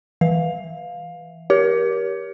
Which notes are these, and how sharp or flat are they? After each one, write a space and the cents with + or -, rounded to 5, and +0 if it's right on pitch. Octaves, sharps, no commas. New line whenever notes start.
E3 -5 F5 +15
G4 -10 A#4 +25 C#5 +25